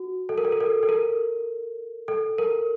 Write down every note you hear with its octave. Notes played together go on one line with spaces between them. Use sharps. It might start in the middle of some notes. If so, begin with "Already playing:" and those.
Already playing: F#4
A4
A#4
A4
A#4
A4
A4
A#4
A4
A#4